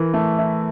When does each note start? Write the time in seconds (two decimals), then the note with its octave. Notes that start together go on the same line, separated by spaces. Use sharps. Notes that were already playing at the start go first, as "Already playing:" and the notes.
Already playing: E3 E4 A#4
0.14 A3
0.38 E4